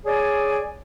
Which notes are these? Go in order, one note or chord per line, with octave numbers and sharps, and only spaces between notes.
G#4 C#5 D5 G#5